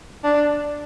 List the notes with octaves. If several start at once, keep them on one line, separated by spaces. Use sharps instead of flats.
D4